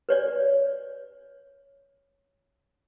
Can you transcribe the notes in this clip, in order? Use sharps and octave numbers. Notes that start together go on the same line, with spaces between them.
B4 C#5 D5